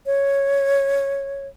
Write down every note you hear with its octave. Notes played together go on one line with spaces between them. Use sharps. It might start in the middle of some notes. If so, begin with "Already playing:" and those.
C#5